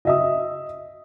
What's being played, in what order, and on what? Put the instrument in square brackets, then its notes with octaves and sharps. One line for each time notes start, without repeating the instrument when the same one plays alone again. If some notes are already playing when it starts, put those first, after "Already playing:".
[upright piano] D#5 E5 D#6